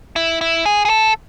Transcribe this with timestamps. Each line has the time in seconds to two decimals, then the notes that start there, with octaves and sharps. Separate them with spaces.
0.16 E4
0.41 E4
0.65 G#4
0.85 G#4
0.89 A4